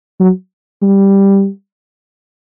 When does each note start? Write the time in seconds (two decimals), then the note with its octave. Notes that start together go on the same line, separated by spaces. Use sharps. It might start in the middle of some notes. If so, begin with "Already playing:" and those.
0.20 F#3
0.82 G3